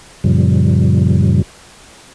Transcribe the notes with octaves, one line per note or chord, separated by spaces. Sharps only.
F#2 A#2 C#3 F3 G3